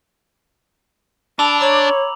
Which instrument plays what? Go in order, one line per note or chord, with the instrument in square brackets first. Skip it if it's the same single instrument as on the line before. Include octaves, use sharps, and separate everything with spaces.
[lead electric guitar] D4 [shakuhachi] A5 [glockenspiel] B5 E6 F7
[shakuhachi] C#5 [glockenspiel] A#5 D6 F#7